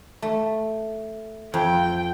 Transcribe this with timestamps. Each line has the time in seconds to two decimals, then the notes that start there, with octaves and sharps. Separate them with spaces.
0.22 A3
1.54 F2 G5